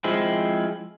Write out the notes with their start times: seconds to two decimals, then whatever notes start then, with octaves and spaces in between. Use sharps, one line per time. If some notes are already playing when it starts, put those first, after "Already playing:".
0.04 F3 G#3 C4 E4